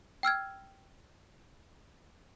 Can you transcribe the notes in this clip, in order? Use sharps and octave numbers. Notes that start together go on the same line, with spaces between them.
G5 E6 F6 G#6